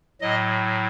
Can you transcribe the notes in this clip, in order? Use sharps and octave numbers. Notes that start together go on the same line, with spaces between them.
A2 F#3 D#5